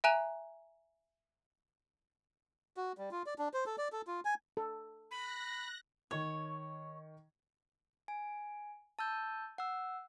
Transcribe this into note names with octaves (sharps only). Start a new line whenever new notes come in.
E5 G#5 A#5 F#6 D#7 F7
F#4
G3
F4
D5
D4
C5
A4
D5
A4
F4
G#5
A4
B5 F#6 A#6
D#3 C#5 C#6 G#6
G#5
A5 E6 G6
F#5 E6